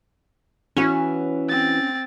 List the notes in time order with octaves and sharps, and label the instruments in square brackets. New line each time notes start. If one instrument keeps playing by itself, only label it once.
[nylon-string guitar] E3 B3 F#4 [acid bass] C#4
[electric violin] C4 A6